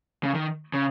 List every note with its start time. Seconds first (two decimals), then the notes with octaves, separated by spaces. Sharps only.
0.23 C#3
0.34 D#3
0.74 C#3